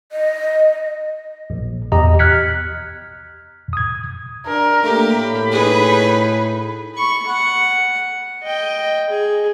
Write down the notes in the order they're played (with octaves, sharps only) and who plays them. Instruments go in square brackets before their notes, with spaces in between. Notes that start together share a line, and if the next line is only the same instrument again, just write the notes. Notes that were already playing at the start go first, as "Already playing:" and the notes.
[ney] D#5
[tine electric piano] A#1
E2 G4 D#5 A#5
F6 F#6 G#6 B6 C#7
D#6 G#6
[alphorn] D4 [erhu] A#4
[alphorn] A3 [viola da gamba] A#3 G4
[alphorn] A2 [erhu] B5
[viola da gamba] D#4 G#4 B4
[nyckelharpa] B5 C#6
F#5
D#5 G5
G#4